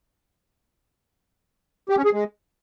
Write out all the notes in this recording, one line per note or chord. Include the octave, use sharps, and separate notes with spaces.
G4
C#4
G#4
G#3